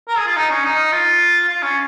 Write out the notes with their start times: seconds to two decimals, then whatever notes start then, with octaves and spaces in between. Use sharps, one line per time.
0.08 A#4
0.17 G#4
0.27 F4
0.36 D#4
0.51 C#4
0.65 D#4
0.92 F4
1.49 F4
1.62 C#4